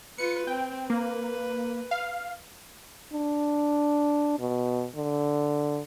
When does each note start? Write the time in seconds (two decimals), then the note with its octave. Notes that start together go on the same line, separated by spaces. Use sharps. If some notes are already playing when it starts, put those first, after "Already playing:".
0.18 F4 B4 C#7
0.47 C4 G5
0.90 A#3 B4
1.91 F5
3.13 D4
4.40 B2
4.96 D3